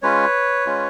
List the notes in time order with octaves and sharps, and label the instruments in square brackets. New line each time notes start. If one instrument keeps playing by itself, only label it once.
[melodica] G#3 C#4 F4 B4 C#5
G#3 C#4 F4